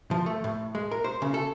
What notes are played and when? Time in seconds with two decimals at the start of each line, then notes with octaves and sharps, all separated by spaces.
0.11 F3
0.26 A3
0.44 A2
0.75 G#3
0.91 A#4
1.04 C5
1.22 C#3
1.34 A4